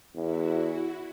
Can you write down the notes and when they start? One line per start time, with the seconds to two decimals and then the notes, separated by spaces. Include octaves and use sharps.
0.15 E2 E4 F#4